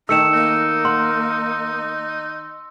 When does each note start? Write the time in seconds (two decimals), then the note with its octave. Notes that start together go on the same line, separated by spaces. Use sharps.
0.09 D#3 A3 D#4 E6 C#7 E7
0.34 A#3 D#4
0.85 F#5 C6